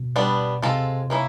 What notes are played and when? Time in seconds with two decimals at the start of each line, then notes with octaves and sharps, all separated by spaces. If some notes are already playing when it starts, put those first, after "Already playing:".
Already playing: B2
0.16 G3 B3 D4
0.62 C3 G#3 C4 F4 A4
1.10 A#3 C#4 E4